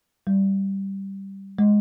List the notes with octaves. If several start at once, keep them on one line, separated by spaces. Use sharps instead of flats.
G3
G#3